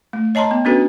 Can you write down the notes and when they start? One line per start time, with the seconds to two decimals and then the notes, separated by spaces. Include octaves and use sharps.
0.13 A3
0.35 C#5 D#5 A5 A#5 C6
0.51 B3
0.65 B3 C#4 D4 F#4 A4 B4